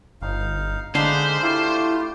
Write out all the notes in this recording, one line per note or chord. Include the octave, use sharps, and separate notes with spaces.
G1 D#4 F5
D3 G#3 D4 D#4 C5 F5 B5
A3 E4 F4 G4